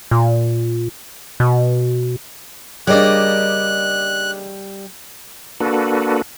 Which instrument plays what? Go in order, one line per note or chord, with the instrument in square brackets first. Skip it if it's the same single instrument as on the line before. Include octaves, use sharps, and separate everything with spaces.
[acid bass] A#2
B2
[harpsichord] C#3 A#3 D4 [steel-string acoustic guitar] G3 D#5 [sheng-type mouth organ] F#6
[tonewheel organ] A#3 D4 F#4 A4 B4